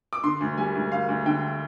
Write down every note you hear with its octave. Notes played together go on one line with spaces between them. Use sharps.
D6
D3 C6
D2
G3 G#5
D2
D2 F5
D2
D3 G5